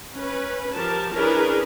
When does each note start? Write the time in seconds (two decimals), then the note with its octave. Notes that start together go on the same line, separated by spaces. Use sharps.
0.14 C#4 B4
0.73 F3 G4 A#4 A5
1.14 C#4 D4 E4 G#4 A#4 B4